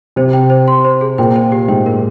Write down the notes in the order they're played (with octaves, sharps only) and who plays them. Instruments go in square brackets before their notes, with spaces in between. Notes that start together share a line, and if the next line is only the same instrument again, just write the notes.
[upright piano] C3 [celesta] C5
[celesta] G5
C5
C6
C5
G#4
[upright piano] A#2 [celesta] G5
[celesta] C5
G4
[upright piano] G#2 [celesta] G5
[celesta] A#4